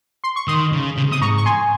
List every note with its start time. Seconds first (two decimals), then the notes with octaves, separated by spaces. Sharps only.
0.24 C6
0.36 C#6
0.48 D#3 C6 D#6
0.72 C#3
0.97 C3
1.04 C#3
1.12 C3 D#6
1.21 G#2 A#5 C#6
1.38 C#6
1.45 G#5 C6